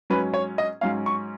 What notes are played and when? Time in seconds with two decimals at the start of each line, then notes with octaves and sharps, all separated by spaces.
0.10 G#2 F#3 C#4 B4
0.34 C#5
0.58 D#5
0.81 G#2 F#3 C#4 F5
1.06 C#6